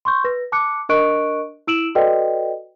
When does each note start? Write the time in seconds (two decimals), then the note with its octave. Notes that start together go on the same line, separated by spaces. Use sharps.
0.05 C6 C#6 G6
0.24 B4 A#6
0.52 A5 D6 F#6 C#7
0.89 D4 A#4 D#5 C#6 F#6 D7
1.67 E4 E6 D7 E7 F#7
1.95 F#4 A4 B4 D5 D#5 G5